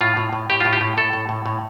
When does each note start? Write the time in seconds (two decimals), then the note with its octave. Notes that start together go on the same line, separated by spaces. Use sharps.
0.01 A2 F4
0.17 A2
0.33 A2
0.50 A2 G4
0.60 A2 F4
0.73 G4
0.81 A2
0.97 A2 A4
1.13 A2
1.29 A2
1.46 A2